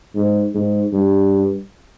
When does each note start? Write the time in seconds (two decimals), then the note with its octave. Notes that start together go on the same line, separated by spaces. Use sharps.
0.15 G#2
0.54 G#2
0.93 G2